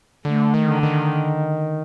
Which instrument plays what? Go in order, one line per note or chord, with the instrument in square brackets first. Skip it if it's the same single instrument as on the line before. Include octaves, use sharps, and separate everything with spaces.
[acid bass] D3 [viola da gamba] A3
[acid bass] D#3
[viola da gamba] D3
[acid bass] D#3